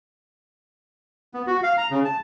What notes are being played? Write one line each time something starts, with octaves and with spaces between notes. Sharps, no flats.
B3
F#4
F5
A#5
C#3
A5